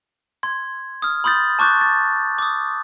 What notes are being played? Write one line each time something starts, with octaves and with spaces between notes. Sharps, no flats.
C6 G#6
D#6 F6
B5 C6 D#6 G6 A6
A5 C#6 D6 F#6 G6 A6
A6
D6 D#6